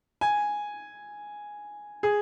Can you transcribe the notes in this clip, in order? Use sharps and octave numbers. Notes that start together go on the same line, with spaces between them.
G#5
G#4